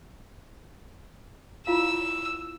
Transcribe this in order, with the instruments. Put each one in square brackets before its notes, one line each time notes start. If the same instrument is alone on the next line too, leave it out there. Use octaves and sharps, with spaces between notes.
[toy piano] E4 F4 F5 [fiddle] E6